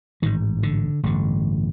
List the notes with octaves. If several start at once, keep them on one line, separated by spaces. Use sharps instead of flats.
A1 G#2 D#3
D3
A1 G2 D3